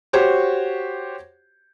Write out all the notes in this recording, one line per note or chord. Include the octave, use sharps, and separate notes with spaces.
F#4 G4 C5 C#5